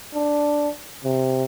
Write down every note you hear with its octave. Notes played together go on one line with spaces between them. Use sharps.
D4
C3